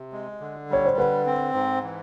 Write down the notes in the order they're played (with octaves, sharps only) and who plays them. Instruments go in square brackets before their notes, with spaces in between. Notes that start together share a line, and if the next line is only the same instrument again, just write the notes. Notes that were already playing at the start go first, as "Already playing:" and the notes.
Already playing: [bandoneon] C3
G#3
D3
[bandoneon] G3 [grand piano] C#5
[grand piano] C5
[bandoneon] D3 [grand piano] B4
[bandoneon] C4
G#2
E3